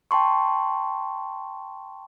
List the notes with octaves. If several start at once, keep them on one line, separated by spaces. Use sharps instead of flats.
G5 A5 C6 C#6